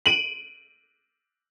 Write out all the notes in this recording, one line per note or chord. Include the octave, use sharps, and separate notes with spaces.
D7 D#7 F#7